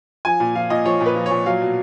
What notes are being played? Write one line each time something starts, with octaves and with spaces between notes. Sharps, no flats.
F3 G#5
A#2
F3 F5
A#2 D#5
F3 C#5
A#2
B4
F3
C#5
A#2
F#3 F5
B2